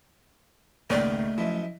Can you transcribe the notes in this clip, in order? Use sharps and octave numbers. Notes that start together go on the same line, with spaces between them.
G#1 C#2 A3 A#3 D5 D#5 G5
F#2 F3 E4 D#5